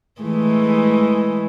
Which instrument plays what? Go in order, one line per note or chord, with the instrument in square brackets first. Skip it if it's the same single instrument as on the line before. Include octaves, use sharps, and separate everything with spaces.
[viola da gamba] E3 G#3 A3